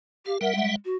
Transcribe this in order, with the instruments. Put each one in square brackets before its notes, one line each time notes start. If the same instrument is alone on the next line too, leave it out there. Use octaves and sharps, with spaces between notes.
[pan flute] G4 [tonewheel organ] F5
[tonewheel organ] G3 E5 F#5 [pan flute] A#4
[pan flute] G#3
F#4